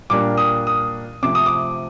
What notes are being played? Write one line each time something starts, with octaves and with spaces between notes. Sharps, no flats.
A#2 G3 A#3 D4 D6
D#6
D#6
C3 F3 A3 D6
D#6
D6